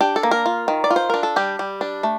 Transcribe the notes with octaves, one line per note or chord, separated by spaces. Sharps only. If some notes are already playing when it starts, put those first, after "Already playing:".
D4 G4
A4
A#3
A#4
F4
D#3
D5
F4
C5
D4 A#4
A4
G3 G4
G3
D4
A3